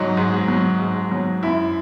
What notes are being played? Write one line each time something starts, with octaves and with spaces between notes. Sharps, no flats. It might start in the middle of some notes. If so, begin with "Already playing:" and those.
Already playing: G#2 F#3 D#4
G#2
F#3
G#2
F#3
F#2 E4